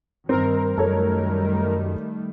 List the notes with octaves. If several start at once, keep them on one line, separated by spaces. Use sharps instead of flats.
G2 D#3 C4 A#4
F#2 D#3 G3 A3 A4 C#5